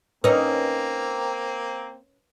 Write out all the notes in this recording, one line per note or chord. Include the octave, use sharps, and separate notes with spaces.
A#3 C4 C#4 D#4 A#4 B4 D#6